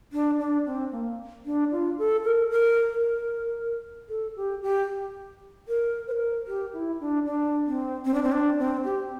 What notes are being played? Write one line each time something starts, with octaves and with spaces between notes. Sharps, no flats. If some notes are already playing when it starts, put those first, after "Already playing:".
D4
D4
C4
A#3
D4
F4
A4
A#4
A#4
A#4
A4
G4
G4
A#4
C5
A#4
G4
E4
D4
D4
C4
C4
D4
C4
D4
C4
G4